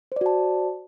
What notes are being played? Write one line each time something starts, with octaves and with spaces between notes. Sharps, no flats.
F#4 C5 D5 A5